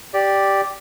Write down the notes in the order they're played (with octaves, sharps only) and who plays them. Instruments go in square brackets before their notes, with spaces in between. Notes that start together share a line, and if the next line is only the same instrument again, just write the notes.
[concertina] G4 D5